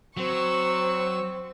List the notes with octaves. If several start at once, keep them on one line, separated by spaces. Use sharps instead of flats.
F#3 C4 C#6 E6